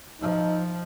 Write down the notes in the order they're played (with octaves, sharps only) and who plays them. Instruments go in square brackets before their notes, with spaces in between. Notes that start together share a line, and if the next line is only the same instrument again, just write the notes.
[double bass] F3 [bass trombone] D#4